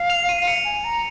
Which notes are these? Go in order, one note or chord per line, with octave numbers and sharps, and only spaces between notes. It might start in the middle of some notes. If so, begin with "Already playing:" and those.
Already playing: F5
F7
D#7
C#7
G#5
A#5